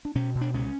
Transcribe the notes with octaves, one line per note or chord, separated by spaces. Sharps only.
D4
B2 C#4
B2
D4
C#2 C#4